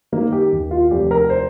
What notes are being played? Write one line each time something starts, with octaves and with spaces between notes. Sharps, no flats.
D#3 A#3
G4
D#2
F4
F1 G4
A#4
C5